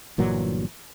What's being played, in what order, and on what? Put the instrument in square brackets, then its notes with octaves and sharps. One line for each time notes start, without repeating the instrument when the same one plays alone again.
[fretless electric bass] G1 A#2 E3 F#3